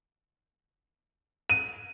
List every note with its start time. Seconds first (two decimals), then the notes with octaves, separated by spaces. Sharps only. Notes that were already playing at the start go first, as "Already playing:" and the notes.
1.49 D#7